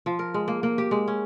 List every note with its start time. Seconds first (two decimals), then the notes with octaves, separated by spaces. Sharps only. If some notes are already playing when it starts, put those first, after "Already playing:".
0.06 F3
0.19 A#4
0.34 G#3
0.48 A#3
0.63 A#3
0.78 G4
0.91 G#3
1.08 C#4